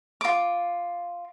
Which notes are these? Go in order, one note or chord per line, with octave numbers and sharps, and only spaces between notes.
F4 D6